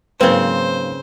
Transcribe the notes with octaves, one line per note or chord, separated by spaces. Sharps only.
G#2 C#3 F#3 A#3 C4 B4 C5